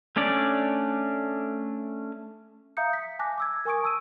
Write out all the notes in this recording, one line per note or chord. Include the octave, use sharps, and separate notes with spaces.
A3 C#4 D4 D5
E5 F5 A#5 D#6 G6 C#7
B6
G#5 A5 D6 F#6 A#6
D6 E6 G#6
A#4 G#5 C#6 D#6 D7
A5 E6 D#7